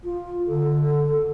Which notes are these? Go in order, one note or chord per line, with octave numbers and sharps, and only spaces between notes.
F4
D3 A4